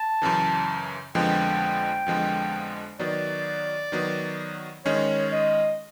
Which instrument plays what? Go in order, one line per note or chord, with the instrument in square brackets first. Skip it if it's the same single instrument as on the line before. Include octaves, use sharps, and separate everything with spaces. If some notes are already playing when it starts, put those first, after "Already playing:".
Already playing: [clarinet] A5
[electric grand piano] F#2 C#3 E3
[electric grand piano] F2 D3 F3 G#3 B3 [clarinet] G5
[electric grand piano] F2 D3 F3 G#3 B3
[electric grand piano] D#3 F#3 B3 [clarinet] D5
[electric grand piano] D#3 F#3 B3
[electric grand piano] D#3 G#3 C#4 [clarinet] C#5
[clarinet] D#5